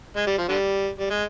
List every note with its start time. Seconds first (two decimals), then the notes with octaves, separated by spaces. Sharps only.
0.17 G#3
0.27 G3
0.38 F3
0.49 D3 G3
0.99 G3
1.10 G#3